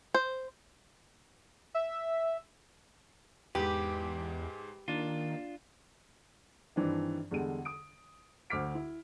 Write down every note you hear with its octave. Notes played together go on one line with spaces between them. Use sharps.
C5
E5
E2 G#2 G#3 G4 B4
D#3 A#3 D4 F4
G2 D#3 E3 C4 D4
E2 D3 G3 G#3 D#7
D#6 D7
D2 C5 D6 F6 B6 D7
E4